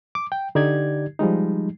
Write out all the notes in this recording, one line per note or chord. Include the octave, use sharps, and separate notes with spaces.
D6
G5
D3 D#4 G4 D5 G#6
F3 G3 G#3 D#4